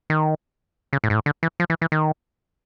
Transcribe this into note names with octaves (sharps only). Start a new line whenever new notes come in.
D#3
C#3
A2
G#2
A2
D3
E3
F3
E3
E3
D#3